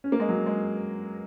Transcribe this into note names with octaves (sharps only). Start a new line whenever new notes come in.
C#4
A#3
G#3
F#3
G#3